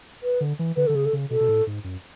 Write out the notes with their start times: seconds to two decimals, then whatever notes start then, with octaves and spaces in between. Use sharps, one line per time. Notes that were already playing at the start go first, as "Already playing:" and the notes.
0.23 B4
0.41 D3
0.59 E3
0.76 D3 B4
0.87 D3 A4
0.95 C#3 G#4
1.06 A4
1.13 C#3
1.30 B2 A4
1.41 B2
1.49 A2
1.67 G#2
1.84 F#2